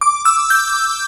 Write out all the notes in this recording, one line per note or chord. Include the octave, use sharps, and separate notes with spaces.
D6
E6
G6